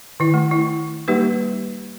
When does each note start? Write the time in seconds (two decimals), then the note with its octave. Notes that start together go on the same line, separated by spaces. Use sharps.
0.20 D#3 E4
0.34 A3
0.51 E4
1.08 G3 A#3 D#4 G4 B4